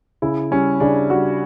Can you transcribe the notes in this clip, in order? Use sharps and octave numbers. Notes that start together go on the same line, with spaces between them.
C#3 E4
G3 C#4
C#3 D4
G3 F#4